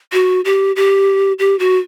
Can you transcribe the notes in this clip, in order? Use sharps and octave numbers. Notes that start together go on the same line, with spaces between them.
F#4
G4
G4
G4
F#4